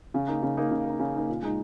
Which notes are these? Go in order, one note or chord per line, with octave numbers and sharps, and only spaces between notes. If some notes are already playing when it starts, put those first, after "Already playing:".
C#3
A#3 D#4
C#3
A#3 D#4
C#3
A#3 D#4
C#3
A#3 D#4
A#2
G#3 D#4